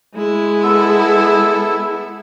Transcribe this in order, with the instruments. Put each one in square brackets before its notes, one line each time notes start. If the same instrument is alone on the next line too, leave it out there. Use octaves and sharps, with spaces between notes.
[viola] G#3 E4
[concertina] B3 A4 E6